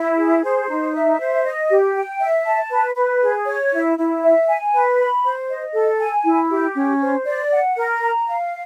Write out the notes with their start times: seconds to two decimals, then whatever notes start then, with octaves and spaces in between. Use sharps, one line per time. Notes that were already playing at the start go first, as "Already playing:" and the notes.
Already playing: E4
0.18 G#4
0.44 C5
0.69 D#4
0.94 E5
1.20 C5
1.45 D#5
1.70 G4
1.96 G5
2.20 E5
2.46 A5
2.71 B4
2.96 B4
3.21 G#4
3.46 C#5
3.73 E4
3.97 E4
4.23 E5
4.49 G#5
4.74 B4
4.99 B5
5.24 C5
5.50 D#5
5.74 A4
5.99 G#5
6.25 E4
6.51 G4
6.75 C#4
7.00 C5
7.25 D5
7.52 F#5
7.76 A#4
8.02 A#5
8.27 F5